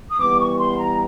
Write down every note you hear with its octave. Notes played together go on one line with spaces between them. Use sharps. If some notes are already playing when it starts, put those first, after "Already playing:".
D#6
E3 G3 B3 D6
C#6
C6
A#5